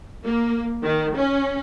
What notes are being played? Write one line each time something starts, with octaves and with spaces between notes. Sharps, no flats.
A#3
D#3
C#4